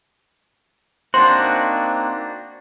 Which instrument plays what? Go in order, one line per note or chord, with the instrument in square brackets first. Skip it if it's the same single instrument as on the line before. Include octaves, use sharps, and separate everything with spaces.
[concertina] A#3 C4 D#4 [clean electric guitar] D4 F#4 [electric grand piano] C5 [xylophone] C6